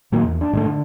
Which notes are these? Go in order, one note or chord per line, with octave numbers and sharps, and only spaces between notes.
A2 D#3 F#3 A#3
E2
D4
G#2 D3 A3
D3